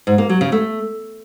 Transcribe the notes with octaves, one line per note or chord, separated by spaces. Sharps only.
G#2
A#3
F#3
C#3
A3